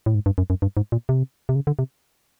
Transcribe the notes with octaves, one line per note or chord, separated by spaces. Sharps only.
A2
G#2
G2
F#2
F#2
G2
G#2
A#2
C3
C3
C#3
D3
C3